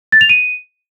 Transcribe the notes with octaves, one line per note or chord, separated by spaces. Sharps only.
A6
F7
D#7